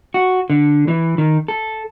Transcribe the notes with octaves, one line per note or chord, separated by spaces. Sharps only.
F#4
D3
E3
D#3
A4